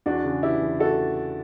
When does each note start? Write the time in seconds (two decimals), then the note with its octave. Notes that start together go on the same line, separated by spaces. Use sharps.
0.06 E2 D4 F#4
0.24 C#3
0.42 E3 E4 G4
0.62 E2
0.80 F#4 A4